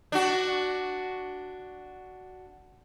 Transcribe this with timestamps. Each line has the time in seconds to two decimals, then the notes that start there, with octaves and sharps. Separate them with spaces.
0.12 D4 F#4